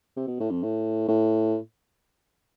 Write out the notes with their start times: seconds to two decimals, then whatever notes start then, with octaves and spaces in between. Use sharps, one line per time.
0.17 C3
0.27 B2
0.40 A2
0.51 F2
0.63 A2
1.09 A2